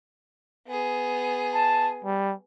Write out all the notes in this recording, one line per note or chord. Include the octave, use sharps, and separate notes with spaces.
B3 G#4
A5
G3